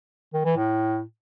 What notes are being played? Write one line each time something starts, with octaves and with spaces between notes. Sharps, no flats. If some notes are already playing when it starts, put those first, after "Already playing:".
D#3
E3
A2